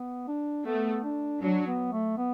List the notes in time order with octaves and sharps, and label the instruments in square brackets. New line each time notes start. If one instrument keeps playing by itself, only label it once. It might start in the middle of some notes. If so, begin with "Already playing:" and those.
Already playing: [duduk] B3
D4
[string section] A3 [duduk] B3
[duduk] D4
[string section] F#3 [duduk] D4
[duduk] B3
A3
B3